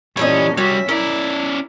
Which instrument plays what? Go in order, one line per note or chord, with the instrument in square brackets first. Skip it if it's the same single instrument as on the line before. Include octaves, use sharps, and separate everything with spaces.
[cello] A#2 C#4 [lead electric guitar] E3 C#5 [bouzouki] G3 A4 D#5
[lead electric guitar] C2 G3 [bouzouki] C#4 [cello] F#4 E5
[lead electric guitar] C#4 D5 [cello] E4 [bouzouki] A#4